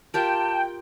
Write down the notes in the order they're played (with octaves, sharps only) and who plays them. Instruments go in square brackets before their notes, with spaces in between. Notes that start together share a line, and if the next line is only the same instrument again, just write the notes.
[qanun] F4 G4 A#4 [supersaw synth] G5 [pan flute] A5